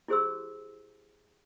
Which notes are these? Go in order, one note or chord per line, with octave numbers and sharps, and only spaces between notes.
E4 G4 G#4 C5 C6 E6